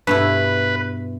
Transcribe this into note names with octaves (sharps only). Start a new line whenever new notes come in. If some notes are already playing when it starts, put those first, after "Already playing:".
G2 B2 E4 B4